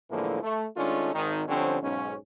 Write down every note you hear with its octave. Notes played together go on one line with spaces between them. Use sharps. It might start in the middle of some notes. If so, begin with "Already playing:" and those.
A2 D3 E3 F3 G#3 A#3
A3
D#3 G#3 A3 C#4 D4 F4
G#1 D#3 D#4
D3 F3 G3 C4 C#4
B1 G#2 C#4